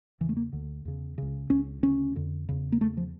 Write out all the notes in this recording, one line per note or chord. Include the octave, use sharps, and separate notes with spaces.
E2 C#3 E3
A3
A#3
D2 D3
E2 C#3
C#2 C#3
C#2 C#3 C#4
D2 C#3 C#4
F2 D3
E2 C#3
A#3
E2 C#3 A3
F3